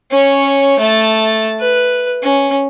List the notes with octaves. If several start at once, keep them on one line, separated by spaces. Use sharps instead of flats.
C#4 C#5
A3 A5
B4
C#4